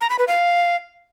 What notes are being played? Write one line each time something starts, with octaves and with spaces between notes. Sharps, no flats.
A#5
B5
B4
F5